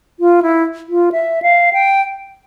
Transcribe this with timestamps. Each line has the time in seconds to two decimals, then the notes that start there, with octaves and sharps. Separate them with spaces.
0.20 F4
0.43 E4
0.89 F4
1.12 E5
1.42 F5
1.73 G5